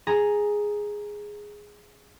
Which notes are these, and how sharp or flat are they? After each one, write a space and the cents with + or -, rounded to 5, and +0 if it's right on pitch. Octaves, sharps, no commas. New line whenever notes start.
G#4 +0 A#5 +0